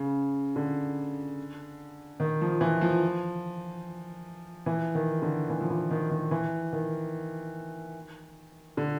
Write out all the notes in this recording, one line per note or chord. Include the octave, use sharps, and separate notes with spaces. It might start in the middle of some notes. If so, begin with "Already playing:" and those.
Already playing: C#3
D3
D#3
F3
E3
F3
E3
D#3
D3
E3
F3
E3
D#3
D#3
E3
D#3
D3